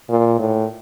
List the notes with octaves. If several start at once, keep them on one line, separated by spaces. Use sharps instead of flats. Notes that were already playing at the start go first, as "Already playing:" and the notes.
A#2
A2